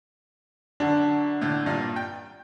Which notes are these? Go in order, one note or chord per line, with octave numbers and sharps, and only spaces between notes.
F#2 D3 D4
A2 D3
G2 A#2
G5